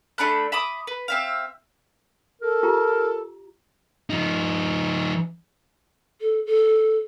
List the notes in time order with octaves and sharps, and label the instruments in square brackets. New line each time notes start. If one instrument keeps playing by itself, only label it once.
[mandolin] A3 D4 B5 F#6
E5 B5 D6 D#6
B4
C4 E5 F5
[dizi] A4 [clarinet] A#4
[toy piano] F4 G4 A#5
[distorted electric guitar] F3 D#4
[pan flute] A4
A4